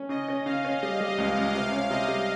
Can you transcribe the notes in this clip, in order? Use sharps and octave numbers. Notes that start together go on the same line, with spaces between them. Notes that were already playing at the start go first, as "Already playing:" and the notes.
Already playing: C#4
C#3 D#5
C#4
C#3 F5
C#4
G3 D#5
G3
C#2
C#2
C3 F5
C#4
C3 D#5
G3